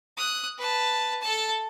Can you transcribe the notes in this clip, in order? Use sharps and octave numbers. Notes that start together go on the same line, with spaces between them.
D#6 F#6
B4 A5
A4 A5